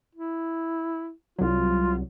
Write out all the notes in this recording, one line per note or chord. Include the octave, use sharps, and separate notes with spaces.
E4
C2 F#3 F4